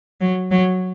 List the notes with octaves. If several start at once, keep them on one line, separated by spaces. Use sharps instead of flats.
F#3
F#3